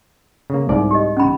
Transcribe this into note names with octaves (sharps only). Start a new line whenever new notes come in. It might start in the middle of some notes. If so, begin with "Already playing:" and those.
C#3 A#3
C2 G#2 D#4 D5
G4 D#5
C#4 B5